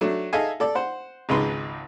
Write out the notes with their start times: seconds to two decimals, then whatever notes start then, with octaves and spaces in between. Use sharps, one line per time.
0.01 F#3 A3 D4
0.33 D#4 G#4 A4 E5 F5 G#5
0.60 A4 D5
0.75 C5 F#5
1.29 G#1 C#2 G#2 B4 C6